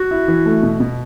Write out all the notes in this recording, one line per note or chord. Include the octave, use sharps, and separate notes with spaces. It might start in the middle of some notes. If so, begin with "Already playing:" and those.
Already playing: F#4
E4
E3
A3
B2
B2